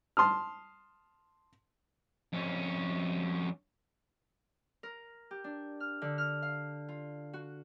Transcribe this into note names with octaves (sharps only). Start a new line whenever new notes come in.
A5 C6 D#6 F6
F2 C#4
A#4
G4
D4
F6
D3
F6
F5
F4
F#4